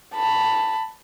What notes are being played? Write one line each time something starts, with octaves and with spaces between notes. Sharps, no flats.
A5 B5